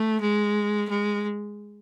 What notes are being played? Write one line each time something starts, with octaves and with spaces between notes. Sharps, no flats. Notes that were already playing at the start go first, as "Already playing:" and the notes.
Already playing: A3
G#3
G#3